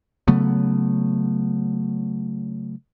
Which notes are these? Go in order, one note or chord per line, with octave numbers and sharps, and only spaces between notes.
C#3 F#3 A3 B3